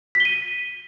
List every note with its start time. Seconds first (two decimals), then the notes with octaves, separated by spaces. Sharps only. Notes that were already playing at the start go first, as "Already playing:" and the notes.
0.15 B6
0.20 G7
0.25 D#7